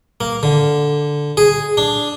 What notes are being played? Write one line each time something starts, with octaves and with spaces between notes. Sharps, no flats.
A#3
D3
G#4
D4